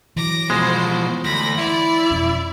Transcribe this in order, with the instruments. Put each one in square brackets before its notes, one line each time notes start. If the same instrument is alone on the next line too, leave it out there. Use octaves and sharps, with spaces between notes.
[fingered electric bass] E3 F#3 [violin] D6 A#6
[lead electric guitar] B2 F3 [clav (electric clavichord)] G#3 [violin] C5
[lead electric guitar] D2 [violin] B5 A#6
[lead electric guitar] E4 [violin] D5
[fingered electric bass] E1 F2 C#4